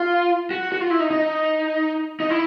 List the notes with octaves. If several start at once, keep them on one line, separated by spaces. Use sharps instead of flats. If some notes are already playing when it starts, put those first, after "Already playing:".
Already playing: F4
F#4
F#4
F4
E4
D#4
D#4
D#4
E4